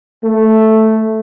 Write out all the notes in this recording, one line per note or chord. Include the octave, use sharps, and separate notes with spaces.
A3